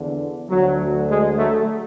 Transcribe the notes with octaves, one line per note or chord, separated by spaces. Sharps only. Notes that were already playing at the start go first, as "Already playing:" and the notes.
Already playing: E2 D3
D2 D3 F#3
G#3
F#3 A3